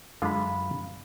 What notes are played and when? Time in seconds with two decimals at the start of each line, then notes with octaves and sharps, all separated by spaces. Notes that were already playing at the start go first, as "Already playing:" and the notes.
0.22 F#2 D3 G#3 F4 F5 B5